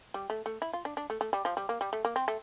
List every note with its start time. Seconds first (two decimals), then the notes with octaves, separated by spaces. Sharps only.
0.14 G3
0.30 A3
0.46 A3
0.62 E4
0.73 F4
0.85 D4
0.97 D4
1.10 A3
1.21 A3
1.33 G3
1.45 F3
1.57 G3
1.69 A#3
1.81 G3
1.93 A3
2.05 A#3
2.16 C4
2.28 A3